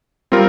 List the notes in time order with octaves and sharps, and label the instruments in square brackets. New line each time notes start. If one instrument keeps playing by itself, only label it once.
[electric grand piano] G3 C4 F4 A#4